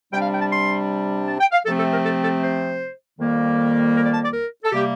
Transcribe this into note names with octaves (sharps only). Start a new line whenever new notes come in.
C3 G3 D4 G5
F5
G5
A5
C6
A5
G5
F5
C3 F3 A3 C4 A4
A4
A#4
A4
A4
C5
F2 D#3 G3 A#3
A#4
D5
A5
D5
A#4
A4
C3 G3 A#3 G4